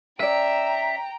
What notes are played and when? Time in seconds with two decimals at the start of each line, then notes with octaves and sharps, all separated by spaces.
0.20 C#4 D5 E5 G5 A#5